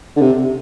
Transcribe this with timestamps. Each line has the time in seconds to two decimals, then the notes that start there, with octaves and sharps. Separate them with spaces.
0.16 D3
0.22 C3